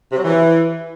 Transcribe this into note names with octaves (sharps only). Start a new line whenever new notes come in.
C3
F#3
E3